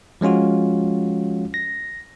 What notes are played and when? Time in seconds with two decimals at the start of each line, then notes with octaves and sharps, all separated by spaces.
0.21 F3 G#3 C#4 F4 F#4
1.54 A#6